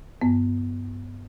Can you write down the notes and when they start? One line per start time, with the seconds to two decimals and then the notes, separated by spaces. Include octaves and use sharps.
0.22 G2 B3